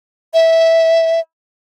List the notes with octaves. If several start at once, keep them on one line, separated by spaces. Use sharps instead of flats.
E5